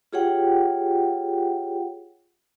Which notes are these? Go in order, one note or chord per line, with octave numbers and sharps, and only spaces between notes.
F4 G4 G#4 C#5 F#5 G5